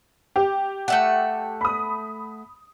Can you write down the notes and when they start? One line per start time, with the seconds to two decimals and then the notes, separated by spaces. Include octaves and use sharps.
0.36 G4
0.88 A3 E5 F#5
1.61 B5 D#6